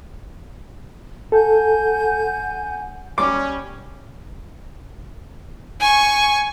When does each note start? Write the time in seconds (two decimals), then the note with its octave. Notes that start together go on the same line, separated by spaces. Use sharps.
1.32 A4 F#5 G#5 G6
3.18 G3 C#4 D6
5.80 G#5 C#6